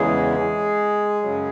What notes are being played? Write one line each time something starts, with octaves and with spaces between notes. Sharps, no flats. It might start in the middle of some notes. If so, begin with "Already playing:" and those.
Already playing: E2 C#3 E3 G#3 G#4
F#2 C#3 F#3